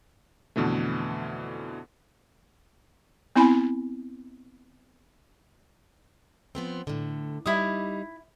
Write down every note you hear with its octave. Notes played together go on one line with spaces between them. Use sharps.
F2 B2 D3 E3 A3
B3 C4 E4 G#5 B5
F3 B3 C4
A2 D3
G3 D#4 E4 D#6